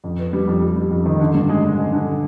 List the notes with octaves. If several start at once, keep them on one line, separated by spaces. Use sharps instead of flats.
F2
B3
G3
F2
G3
G3
F2
D#3
D3
G2
G#3
G#3
D3
D3